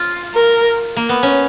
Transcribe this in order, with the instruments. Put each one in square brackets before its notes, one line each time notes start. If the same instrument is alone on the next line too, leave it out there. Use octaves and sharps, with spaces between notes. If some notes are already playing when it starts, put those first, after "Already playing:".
Already playing: [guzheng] F4
[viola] A#4
[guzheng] A#3
B3
C#4